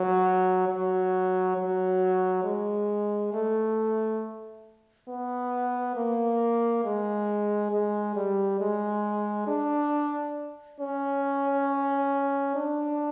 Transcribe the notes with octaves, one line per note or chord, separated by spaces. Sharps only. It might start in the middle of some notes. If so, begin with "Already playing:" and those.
Already playing: F#3
F#3
F#3
G#3
A3
B3
A#3
G#3
G#3
G3
G#3
D4
C#4
D4